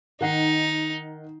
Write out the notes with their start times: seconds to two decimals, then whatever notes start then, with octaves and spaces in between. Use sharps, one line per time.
0.21 D#3 D#4 F#5 C7